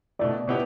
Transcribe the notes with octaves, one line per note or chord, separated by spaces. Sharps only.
B2 A3 E4 D5
B2 B3 E4 G4